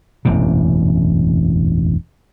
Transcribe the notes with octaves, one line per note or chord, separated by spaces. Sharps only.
E1 A1 F#2 C3